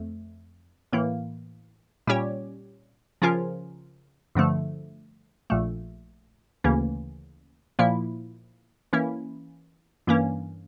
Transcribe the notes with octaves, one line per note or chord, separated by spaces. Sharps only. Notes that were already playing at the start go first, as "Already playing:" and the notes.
Already playing: F2 A3
A2 E3 A#3
A#2 G3 C#4 G4 C#5
C#3 F3 C#4 F4 A#4
G2 D3 F3 A3
A#1 A#2 A3
D2 C#3 E3 A#3 C#4
A#2 F3 A#3 E4
E3 A#3 C#4 E4
G2 E3 A#3 C#4